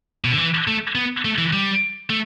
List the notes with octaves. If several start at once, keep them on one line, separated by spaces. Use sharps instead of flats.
B2
D3
E3
A3
B3
A3
E3
G3
A3